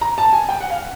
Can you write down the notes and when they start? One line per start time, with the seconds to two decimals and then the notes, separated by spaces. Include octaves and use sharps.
0.01 A#5
0.18 A5
0.33 G#5
0.49 G5
0.61 F#5
0.70 F5